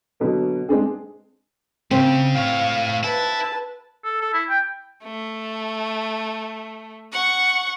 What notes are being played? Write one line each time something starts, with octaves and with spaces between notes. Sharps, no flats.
B2 D3 F#3 B3
G#3 C4 D4 G#4
C#3 C4
A2 C#5 F5
E4 B4 A5
A4
A4
E4
G5
A3
F#5 C#6